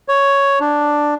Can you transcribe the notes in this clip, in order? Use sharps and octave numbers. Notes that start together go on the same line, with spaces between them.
C#5
D4